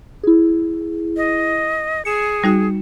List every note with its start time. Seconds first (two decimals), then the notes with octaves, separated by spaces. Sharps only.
0.23 E4 G#4
1.17 D#5
2.05 G#4 C#7 E7
2.44 G3 D#4 F#4